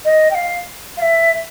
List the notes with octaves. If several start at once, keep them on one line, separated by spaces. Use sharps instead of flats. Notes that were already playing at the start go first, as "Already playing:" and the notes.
D#5
G5
F5
F5
E5